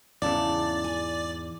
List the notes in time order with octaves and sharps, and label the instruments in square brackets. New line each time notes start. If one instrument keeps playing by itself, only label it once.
[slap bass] E2 G#2 E3 [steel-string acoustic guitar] C#3 A5 [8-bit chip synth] D5
[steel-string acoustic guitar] G#5